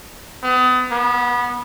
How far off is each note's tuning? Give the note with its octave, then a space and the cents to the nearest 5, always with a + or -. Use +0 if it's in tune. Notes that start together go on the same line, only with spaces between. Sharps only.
B3 +35
B3 -20